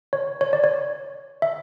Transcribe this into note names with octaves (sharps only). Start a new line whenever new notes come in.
C#5
C#5
D5
C#5
E5